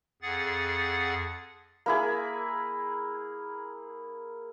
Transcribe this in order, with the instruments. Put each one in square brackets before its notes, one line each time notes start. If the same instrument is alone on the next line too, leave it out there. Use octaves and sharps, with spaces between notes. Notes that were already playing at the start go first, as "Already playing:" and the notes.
[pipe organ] F2 G#4 F#5 A6
[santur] A#3 E4 G#4